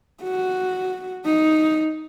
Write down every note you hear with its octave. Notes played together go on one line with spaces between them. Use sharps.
F#4
D#4